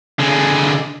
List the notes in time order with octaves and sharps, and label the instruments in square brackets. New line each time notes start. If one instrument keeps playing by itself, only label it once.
[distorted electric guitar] D3 G#3